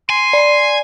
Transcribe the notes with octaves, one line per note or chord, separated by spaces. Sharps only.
G#5 C6
D5